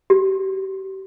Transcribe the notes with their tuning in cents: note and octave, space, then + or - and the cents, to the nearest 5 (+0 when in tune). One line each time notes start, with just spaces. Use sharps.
G4 -35